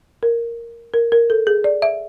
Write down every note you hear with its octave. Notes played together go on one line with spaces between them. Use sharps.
A#4
A#4
A#4
A4
G#4
D5
E5